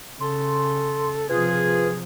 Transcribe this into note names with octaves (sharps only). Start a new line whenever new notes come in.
C#3 A4 C6
C3 F3 F4 G#4 B4